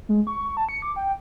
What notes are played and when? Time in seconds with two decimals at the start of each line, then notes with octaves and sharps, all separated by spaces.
0.09 G#3
0.27 C#6
0.57 A5
0.69 C#7
0.82 D6
0.96 G5